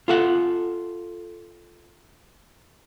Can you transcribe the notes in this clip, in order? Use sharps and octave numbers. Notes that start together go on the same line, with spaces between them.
F4 A4 F#5